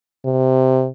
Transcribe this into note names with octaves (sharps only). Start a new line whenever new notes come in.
C3